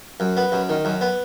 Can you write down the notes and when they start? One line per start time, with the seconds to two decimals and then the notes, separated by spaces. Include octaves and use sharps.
0.20 F#2
0.37 B3
0.52 F#2
0.69 D#3
0.85 F#2
1.01 B3